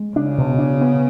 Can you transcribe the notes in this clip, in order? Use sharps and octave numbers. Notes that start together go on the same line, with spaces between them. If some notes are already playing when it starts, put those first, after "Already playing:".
Already playing: G#3
C#3 D4
B2
D4
B3